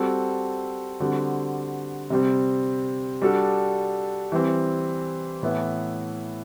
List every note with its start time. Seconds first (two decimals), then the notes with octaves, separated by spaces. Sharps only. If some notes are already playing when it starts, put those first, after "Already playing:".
Already playing: G3 C4 F#4 A4
1.00 D3 G3 C4 F#4
2.10 C3 G3 C4
3.22 G3 D4 F#4 A4
4.32 E3 G3 C4
5.43 A2 E3 B3 E4